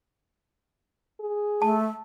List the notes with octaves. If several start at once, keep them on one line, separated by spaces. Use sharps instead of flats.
G#4
A3 A5